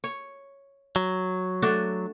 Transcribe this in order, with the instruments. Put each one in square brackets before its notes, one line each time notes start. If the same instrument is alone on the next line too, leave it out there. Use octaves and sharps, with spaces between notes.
[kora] C#5
[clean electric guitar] F#3
[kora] A3 D4 F#4